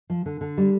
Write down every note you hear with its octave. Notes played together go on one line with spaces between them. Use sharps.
F3
D3
D3
G3